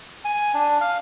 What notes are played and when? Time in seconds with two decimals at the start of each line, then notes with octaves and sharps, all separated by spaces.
0.25 G#5
0.54 D4
0.81 F5